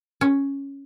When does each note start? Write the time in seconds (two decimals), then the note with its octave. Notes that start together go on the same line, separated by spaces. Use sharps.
0.21 C#4